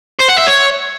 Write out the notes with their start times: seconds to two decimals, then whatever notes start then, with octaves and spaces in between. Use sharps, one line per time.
0.19 C5
0.28 F#5
0.38 E5
0.47 C#5